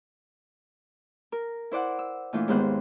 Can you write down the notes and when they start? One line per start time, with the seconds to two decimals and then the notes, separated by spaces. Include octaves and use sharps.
1.32 A#4
1.71 E4 C5 D5 F#5
1.99 E6
2.33 A#2 E3 A3 D4 F4
2.48 D#2 G#2 G#3 B3 C5 F#6